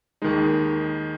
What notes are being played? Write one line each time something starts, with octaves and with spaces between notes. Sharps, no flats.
D#2 D#3 G#3 D#4